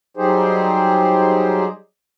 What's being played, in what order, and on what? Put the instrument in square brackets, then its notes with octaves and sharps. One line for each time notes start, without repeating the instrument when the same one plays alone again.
[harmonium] F#3 G3 D#4 G4 G#4 C5